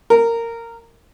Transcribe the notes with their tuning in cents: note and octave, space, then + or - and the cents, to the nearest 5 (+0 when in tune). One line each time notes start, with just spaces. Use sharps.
A#4 -15